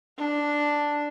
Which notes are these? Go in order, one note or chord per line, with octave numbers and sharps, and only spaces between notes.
D4